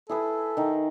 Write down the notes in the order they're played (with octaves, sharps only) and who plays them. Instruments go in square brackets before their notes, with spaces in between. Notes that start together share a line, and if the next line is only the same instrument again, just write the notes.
[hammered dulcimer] E4 G#4 B4 [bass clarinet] A4
[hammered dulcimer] D#3 D#4